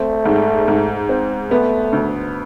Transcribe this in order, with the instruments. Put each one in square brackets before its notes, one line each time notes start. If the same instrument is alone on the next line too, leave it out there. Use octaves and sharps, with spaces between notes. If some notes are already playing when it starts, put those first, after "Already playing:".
Already playing: [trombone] A3 [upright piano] C4
[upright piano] G#2
G#2
C4
[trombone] A3 [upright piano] B3
[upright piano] D2